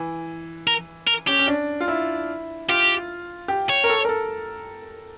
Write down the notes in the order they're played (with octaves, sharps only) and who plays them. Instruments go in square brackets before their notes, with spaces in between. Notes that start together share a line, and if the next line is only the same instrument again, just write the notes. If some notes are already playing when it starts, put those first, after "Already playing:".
Already playing: [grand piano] E3
[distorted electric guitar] A#4
A#4
[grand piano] C#4 [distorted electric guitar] G4
[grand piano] C#4
D4
F4
E4
[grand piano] F4 [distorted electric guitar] G4
[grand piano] G4
[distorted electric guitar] C#5
[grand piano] A#4
A4
A#4
A4